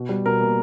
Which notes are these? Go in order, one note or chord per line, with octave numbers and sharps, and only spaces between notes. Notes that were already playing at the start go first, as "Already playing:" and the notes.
Already playing: B2
G3
B2 A#4
A#3